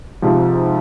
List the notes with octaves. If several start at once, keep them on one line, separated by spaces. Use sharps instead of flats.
G#2 C3 F3